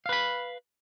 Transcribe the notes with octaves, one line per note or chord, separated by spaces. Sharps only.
B4 F5 B5